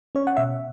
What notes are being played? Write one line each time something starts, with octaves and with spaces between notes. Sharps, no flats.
C#4 C#5
F#5
B2 E5